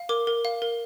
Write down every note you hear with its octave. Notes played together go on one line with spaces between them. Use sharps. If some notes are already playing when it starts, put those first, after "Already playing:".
Already playing: F5
A#4 D6
A#4
F5
A#4